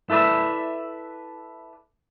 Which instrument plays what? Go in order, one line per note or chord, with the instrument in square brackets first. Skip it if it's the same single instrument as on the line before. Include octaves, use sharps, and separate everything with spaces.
[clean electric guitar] E4 A4 B4 D5 E5